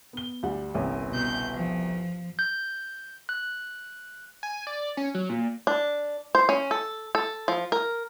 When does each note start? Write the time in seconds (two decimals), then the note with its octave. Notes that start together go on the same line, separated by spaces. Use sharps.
0.13 B3 G7
0.43 D2 G3 F#5
0.74 G1 C2 C#4
1.12 B2 G6
1.53 F3
2.39 G6
3.29 F#6
4.43 G#5
4.67 D5
4.97 C#4
5.15 F#3
5.29 A#2
5.67 D4
6.35 C5
6.49 C#4
6.71 A4
7.15 A4
7.48 F3
7.72 A#4